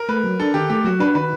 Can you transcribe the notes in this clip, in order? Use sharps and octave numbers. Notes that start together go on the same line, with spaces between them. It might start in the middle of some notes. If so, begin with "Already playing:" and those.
Already playing: A#4
A3 B4
F#3
D4 A4
D#3 G4
A3 G4
F#3 F#4
D4 B4
D#3 B4